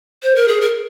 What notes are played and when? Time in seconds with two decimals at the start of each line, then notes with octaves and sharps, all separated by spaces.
0.23 C5
0.35 A#4
0.48 G#4
0.61 A#4